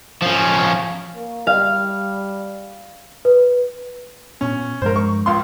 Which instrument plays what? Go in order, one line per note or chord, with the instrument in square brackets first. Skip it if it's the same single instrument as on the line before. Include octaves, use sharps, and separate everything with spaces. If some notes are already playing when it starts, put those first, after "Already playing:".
[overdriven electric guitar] F3 C#4
[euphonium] A#3
[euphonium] G3 [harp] F5
[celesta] B4
[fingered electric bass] A#2 B3 [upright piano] C#4
[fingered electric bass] G2 F3 G#3 [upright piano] A#4 C5
[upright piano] C#6
C#2 F4 C6